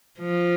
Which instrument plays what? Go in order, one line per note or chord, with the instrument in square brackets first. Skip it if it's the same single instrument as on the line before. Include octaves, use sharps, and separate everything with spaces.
[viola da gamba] F3